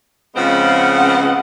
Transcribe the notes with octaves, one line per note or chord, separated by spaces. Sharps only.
C#3 F3 G#3 B3 C4 F#5